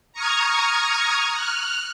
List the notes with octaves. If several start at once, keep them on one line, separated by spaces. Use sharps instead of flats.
A#5 C#6 D#6 F6 G#6
F6 F#6